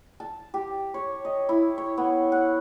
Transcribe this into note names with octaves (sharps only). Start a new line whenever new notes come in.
A5
G4
C#5
D#5
E4
C#5
B3
F#5